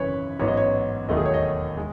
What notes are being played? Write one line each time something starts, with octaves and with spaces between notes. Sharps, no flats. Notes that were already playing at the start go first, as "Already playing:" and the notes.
Already playing: G#1 F#2 C#3 E3 B4 C#5
A1 G#2 F#3 B3 C#5
D#5
C#5
E1 D#2 D#3 F#3 A3 D#5
G#4
C#5
D#5
G#3